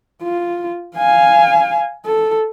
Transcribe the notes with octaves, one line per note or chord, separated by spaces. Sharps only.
F4
F5 G#5
A4